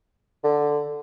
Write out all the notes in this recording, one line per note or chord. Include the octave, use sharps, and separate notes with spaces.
D3